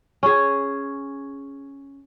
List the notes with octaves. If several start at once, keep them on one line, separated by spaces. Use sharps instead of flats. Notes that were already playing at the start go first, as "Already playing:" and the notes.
C#4 G#4